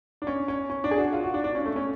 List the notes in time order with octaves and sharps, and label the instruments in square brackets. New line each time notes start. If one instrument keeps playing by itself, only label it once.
[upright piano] D4
C#4
C#4
C#4
D4
G#4
F#4
F4
F#4
D4
D4
C#4
A3
C#4